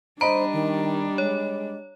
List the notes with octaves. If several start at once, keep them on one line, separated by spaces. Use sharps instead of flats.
G3 D4 C5 D#5 A#5 B5 D7
D#3
G#3 C#5